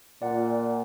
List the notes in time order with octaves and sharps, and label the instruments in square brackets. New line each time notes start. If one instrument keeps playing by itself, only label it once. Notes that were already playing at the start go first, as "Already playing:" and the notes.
[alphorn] A#2 [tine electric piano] D5 F#5